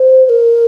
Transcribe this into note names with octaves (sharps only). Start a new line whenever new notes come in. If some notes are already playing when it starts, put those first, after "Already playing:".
Already playing: C5
C5
A#4